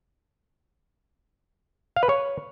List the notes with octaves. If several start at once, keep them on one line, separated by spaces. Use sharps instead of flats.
F5
B4
C#5